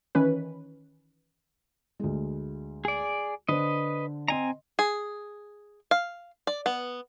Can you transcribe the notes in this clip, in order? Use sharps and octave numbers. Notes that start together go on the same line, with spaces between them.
D#3 E3 C#4 B4
D2 G#3
G#4 D5
D3 B4 C5 D#5
C4 D#5 G#5 A#5 C6
G#4
F5
D5
B3